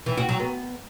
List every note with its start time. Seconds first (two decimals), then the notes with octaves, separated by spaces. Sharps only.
0.06 E3
0.17 F#4
0.29 F#3
0.40 B3